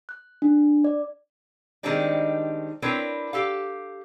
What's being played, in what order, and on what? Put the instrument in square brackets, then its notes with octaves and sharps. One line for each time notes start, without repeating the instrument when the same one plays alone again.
[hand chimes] F#6
D4
D5
[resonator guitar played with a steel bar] D#3 G3 G#3 C4 D4 D#4
C4 D4 E4 A#4 B4 C#5
G4 A4 F5